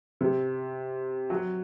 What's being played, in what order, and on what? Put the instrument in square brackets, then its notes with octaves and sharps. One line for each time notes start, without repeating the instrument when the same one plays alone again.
[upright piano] C3
F#3